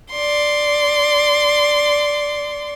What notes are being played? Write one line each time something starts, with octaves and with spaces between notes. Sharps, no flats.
D5 C6